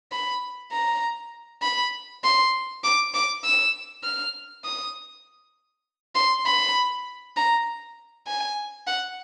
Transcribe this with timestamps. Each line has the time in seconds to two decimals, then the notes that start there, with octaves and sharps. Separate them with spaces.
0.12 B5
0.72 A#5
1.62 B5
2.24 C6
2.84 D6
3.14 D6
3.44 E6
4.04 F6
4.64 D#6
6.15 C6
6.46 B5
7.36 A#5
8.27 G#5
8.87 F#5